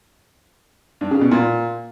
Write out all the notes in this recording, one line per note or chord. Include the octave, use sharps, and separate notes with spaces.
G2
C#3
B2
A#2